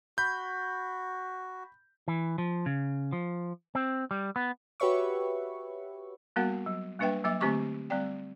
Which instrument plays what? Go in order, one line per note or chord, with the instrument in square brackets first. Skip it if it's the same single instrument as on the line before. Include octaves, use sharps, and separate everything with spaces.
[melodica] F#4 [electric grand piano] B5 G6
[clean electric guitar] E3
F3
C#3
F3
C4
G3
B3
[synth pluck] F#4 G4 B4 C#5 E5 C#6
[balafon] G3 A#3 B3 F#4 A#4 F#5
F#3
G3 A#3 D4 B4 E5 G5
F#3 A#3 E5 D6
D3 A3 C4 G4 C#6 D6
G3 C4 D5 G5